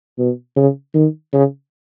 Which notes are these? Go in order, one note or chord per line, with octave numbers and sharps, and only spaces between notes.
B2
C#3
D#3
C#3